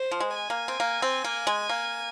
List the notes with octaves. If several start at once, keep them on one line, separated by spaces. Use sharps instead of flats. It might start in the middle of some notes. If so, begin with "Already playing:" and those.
Already playing: C5
F3
G#3
G#5
A#3
C4
A#3
C4
A#3
G#3
A#3